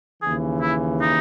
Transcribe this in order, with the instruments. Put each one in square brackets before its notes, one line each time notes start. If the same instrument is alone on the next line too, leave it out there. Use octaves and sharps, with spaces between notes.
[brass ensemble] D#2 C#3 E3 [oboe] G#4
[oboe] E4
D#4